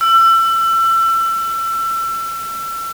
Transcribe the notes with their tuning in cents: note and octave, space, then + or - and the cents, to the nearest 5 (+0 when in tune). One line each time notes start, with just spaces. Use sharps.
E6 +30